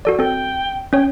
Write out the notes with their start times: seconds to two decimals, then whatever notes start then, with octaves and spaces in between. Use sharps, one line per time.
0.05 F#4 A4 D5
0.19 C4 A4 G5
0.93 C#4 C#5 G5